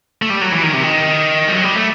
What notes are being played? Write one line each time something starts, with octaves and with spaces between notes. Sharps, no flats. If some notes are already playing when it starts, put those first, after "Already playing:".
A3
G3
F#3
E3
D#3
C3
D#3
G3
F#3
G3
A3